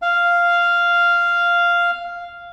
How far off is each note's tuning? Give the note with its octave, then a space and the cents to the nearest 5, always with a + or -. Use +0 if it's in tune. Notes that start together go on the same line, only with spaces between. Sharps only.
F5 -10